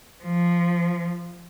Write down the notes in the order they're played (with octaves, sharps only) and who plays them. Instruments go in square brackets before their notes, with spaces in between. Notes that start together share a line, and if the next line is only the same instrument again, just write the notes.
[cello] F3